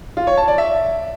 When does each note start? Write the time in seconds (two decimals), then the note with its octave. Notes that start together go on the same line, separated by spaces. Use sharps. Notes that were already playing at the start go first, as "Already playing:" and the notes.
0.17 F4
0.27 C#5
0.37 A5
0.48 D5
0.58 E5